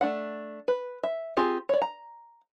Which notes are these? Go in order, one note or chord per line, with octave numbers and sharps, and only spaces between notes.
A3 D4 F#5
B4
E5
C4 F4 G4 G#4
C#5 D5
A#5